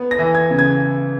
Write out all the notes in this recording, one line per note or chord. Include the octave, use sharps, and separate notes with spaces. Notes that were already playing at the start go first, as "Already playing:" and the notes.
Already playing: B3
A#6
E3
G#6
C#3
G#6